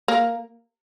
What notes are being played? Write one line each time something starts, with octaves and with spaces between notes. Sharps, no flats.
A#3